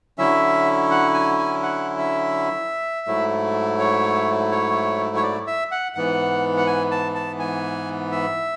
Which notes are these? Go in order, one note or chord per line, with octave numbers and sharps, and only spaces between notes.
D3 F#3 C#4 E4 E5
F#5
G#5
G#5
F#5
E5
G#2 F#3 A3 E4
C#5
C#5
C#5
D5
E5
F#5
G#2 E3 B3 F#5
F#5
G#5
A5
A5
G#5
E5